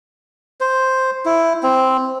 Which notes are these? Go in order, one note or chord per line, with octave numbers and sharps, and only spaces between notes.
C5
E4
C4